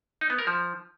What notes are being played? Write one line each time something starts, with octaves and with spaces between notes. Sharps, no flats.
D#4
B3
A#4
F3